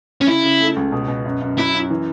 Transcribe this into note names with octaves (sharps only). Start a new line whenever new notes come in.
C#4
C#3 E4
C#3
A3
C#2
B2
B2
F#2
F#2
F#3 E4
F#2
E3